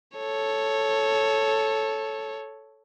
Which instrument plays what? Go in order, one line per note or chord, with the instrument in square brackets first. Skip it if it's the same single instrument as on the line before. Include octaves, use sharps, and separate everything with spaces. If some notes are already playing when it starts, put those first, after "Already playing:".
[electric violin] A4 C#5